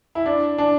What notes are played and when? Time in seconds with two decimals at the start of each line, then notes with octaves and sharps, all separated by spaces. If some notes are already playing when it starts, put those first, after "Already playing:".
0.15 E4
0.26 D4
0.58 D4